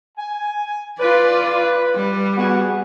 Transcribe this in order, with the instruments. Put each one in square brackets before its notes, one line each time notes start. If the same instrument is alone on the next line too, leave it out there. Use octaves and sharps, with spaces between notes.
[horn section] G#5
[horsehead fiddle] F4 D5 [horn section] B4
[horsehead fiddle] G3
[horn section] B3 F#4 G#4